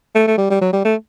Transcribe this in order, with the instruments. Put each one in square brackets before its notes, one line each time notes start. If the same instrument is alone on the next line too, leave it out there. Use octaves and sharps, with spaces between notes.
[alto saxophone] A3
A3
G3
G3
F#3
G3
A3